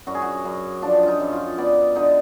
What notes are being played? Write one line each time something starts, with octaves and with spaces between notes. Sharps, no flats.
F#2 F#4
G#4
F#4
F#2
F3 D4
D#4 F4
F#2
F4
B3 D5
D3 D#4